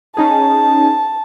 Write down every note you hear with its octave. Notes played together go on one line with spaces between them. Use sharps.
C#4 D#4 G#4 A5